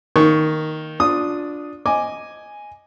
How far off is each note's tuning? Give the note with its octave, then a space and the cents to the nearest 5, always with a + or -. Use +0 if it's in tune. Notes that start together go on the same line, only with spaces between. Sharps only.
D#3 +0 A#3 +0 C#6 +0
D4 +0 F4 +20 D#6 +0
D#5 +0 G#5 +0 D6 +0